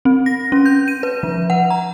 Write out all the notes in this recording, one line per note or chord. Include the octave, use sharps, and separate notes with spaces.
C4
A#6
C#4
G6
D#7
B4
F3
F#5
A#5